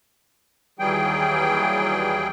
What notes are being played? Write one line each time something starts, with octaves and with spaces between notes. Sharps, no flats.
D#2 E3 F#3 G3 G#4 G5